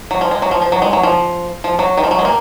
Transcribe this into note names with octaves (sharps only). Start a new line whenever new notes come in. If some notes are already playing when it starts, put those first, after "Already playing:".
F#3
F3
G#3
F#3
F3
F3
F#3
G#3
F#3
F3
F3
F#3
D#3
F3
F#3
G#3
A#3